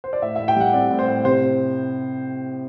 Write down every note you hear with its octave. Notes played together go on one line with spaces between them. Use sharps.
C5
D5
A2 E5
A2 E5
G5
G3 F#5
C4 D5
A2
C5
A2
C3 C5